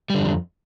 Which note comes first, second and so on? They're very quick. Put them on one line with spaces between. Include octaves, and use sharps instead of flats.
G3 D3 F2